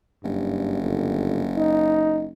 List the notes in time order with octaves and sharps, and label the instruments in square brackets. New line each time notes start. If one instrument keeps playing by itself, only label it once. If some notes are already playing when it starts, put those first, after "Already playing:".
[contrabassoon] F#1 [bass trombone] G2
[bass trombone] G1
D#4